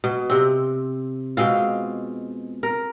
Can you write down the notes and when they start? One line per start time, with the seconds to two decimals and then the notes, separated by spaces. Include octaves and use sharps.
0.04 B2
0.30 C3 C4
1.37 B2 G#3 C4 F4
2.63 A#4